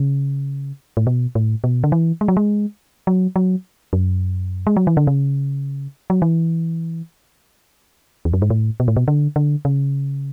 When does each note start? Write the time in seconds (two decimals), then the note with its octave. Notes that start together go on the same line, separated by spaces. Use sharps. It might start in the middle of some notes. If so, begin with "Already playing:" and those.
Already playing: C#3
0.97 A2
1.07 B2
1.35 A2
1.64 B2
1.84 D3
1.92 E3
2.21 G#3
2.28 F#3
2.37 G#3
3.07 F#3
3.36 F#3
3.93 F#2
4.67 G#3
4.77 F#3
4.87 E3
4.97 D3
5.07 C#3
6.10 F#3
6.22 E3
8.25 E2
8.33 F#2
8.42 G#2
8.50 A2
8.80 B2
8.88 A2
8.97 B2
9.08 D3
9.36 D3
9.65 C#3